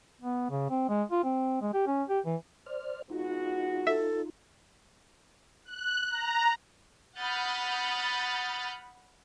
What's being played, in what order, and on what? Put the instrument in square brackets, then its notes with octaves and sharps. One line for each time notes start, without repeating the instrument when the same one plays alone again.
[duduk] B3
C#3
C4
G#3
F4
C4
G#3
G4
C#4
G4
E3
[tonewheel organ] C5 D5 F6
[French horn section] G#3 B3 F#4 [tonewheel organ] D#4 F4
[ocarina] A4 [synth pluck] E5
[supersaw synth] F#6
A#5
[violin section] F#5 B5 D#6 F6 G6 A6